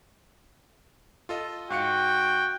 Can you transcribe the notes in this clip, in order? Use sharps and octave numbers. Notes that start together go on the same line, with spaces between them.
F4 A4 D#5
G#2 F#4 F5 G5 C#7